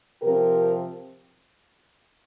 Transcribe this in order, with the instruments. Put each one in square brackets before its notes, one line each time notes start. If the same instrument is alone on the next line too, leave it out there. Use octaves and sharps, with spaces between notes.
[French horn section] C3 F3 C4 G4 A#4